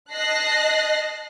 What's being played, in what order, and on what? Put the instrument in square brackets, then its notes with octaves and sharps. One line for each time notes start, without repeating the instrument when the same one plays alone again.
[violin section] D#5 A5 F#6 A#6 C7